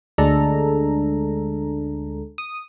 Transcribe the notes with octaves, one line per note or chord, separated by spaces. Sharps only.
D2 G#3 D4 A4 A#5
D#6